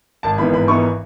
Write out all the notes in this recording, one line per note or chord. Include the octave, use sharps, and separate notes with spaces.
G#1 A5
G#2 E3 B3 D#4 B5
G#1 B5
G#2 E3 B3 D#4 C#6